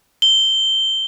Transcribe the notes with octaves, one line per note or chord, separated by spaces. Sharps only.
G7